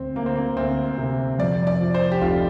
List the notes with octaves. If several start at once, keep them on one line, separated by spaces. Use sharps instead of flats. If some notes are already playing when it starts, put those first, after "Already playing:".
Already playing: D2 C4
D2 A#3
C4
A#3
D2 C4
C3
F2 D5
D5
F3
C5
G4
F1 F4